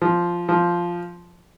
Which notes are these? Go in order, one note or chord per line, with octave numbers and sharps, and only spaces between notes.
F3
F3